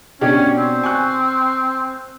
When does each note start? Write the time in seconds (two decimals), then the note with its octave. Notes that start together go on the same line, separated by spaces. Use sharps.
0.21 B2 C#4 D4 G4
0.57 C4
0.84 G#5 C#6 F#6